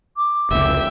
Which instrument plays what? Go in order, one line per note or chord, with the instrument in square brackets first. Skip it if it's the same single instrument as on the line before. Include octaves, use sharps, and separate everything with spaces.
[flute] D6
[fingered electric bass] F1 C#2 [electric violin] E5 G5